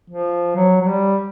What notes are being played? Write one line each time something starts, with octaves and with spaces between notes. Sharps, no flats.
F3
F#3
F#3
G3